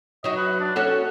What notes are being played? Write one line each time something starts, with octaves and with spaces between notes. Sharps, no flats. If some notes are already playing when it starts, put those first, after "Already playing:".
F#3 D#4 F#4 D#5
B4
D4
C#4 F#4 A4 F#5